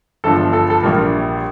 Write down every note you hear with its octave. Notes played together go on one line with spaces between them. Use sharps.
G1 G2 F3 A4
A4
A4
A#1 A#2 G3 A#4